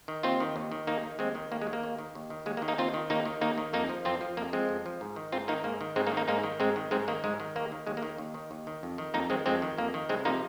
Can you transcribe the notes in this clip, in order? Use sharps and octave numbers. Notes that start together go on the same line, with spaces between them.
D#3
D#2 C4 F4
D#3
D#2
D#3
D#2 A#3 D#4
D#3
D#2 G#3 C4
D#3
D#2 A#3
G#3
D#3
A#3
D#2
D#3
D#2
D#3
D#2 G#3
A#3
D#3
A#3 D#4
D#2 C4 F4
D#3
D#2 A#3 D#4
D#3
D#2 A#3 D#4
D#3
F2 A#3 D#4
F3
F2 C4 F4
F3
F2 A#3
F3 G#3 C4
F2
F3
G#2
D#3
G#2 C4 F4
D#3 A#3 D#4
G#2 A#3
D#3
G#2 G#3 C4
A#3 D#4
D#3
A#3 D#4
G#2 A#3 D#4
D#3
G#2 G#3 C4
D#3
G#2 G#3 C4
D#3 A#3
G#2 G#3
D#3
D#2 A#3
D#3
D#2 G#3
A#3
D#3
D#2
D#3
D#2
D#3
F2
D#3
F2 A#3 D#4
D#3 G#3 C4
F2 G#3 C4
D#3
F2 A#3
D#3
C2 G#3 C4
C3 F3 A#3 D#4